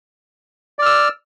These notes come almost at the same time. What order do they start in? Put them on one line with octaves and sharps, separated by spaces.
D5 F6 E6